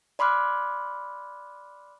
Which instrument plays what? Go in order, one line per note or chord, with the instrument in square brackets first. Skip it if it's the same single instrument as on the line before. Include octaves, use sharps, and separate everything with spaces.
[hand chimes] D5 B5 C6 D6 F6 F#6